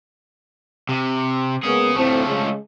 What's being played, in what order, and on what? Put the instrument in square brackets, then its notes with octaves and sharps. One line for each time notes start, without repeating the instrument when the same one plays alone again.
[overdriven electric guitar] C3
[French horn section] G#3 A#3 B3 [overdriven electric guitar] C#4 G#4
[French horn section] D2 A2 C4 [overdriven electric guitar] F3 A3
[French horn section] C#3 G#3